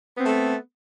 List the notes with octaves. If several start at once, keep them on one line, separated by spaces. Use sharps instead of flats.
A3 B3 C4 A4